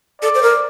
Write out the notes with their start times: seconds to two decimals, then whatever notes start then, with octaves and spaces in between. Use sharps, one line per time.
0.22 A4 D5
0.35 C5
0.43 A#4